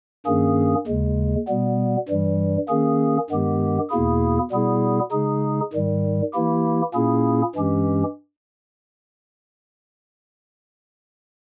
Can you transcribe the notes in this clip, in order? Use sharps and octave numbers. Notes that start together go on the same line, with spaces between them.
G2 D#3 A#3 C#4 G#4
D#2 C#3 G#3
B2 G3 B3
G2 E3 G3
D#3 A#3 C#4 G#4
G2 D#3 G#3 B3 G4
E2 B2 A#3 E4 G#4
B2 G3 B3 E4 G#4
C#3 G#3 D#4 G#4
G#2 D#3 G3
E3 A#3 E4 G4
A#2 A#3 C#4 E4 G#4
G2 E3 G#3 C#4 G4